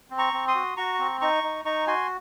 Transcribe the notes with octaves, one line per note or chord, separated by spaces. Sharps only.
C4
A#5 C#6
C4
C6 D#6
F#4
F#4 A#5 C#6
C4
D#4 A#5 C#6
D#4
D#4 A#5 C#6
F#4 G#5 C6